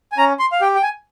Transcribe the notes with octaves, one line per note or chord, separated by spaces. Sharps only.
G#5
C#4 A#5
C6
F5
G4 G5
G5
G#5